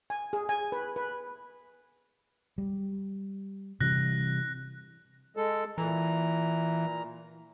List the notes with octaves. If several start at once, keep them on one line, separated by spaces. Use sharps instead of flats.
G#5
G#4
G#5
B4
B4
G3
C3 E3 G3 F#6 A#6
G#3 A4
A#2 E3 A#5